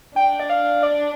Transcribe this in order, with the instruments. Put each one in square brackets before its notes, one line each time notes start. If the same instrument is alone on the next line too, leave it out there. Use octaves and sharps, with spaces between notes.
[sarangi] D4 [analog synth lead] G5
[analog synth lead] D5
F5
D5